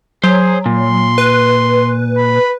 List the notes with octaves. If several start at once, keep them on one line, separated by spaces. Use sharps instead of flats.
F#3 G#4 C5
A#2 C6
B4
B5